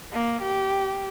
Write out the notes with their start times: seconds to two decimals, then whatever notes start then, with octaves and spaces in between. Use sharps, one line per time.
0.13 A#3
0.42 G4